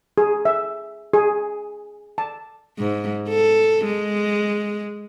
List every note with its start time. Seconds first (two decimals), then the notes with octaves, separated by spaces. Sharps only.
0.18 G#4
0.45 E5
1.13 G#4
2.18 A5
2.78 G#2
3.29 A4
3.85 G#3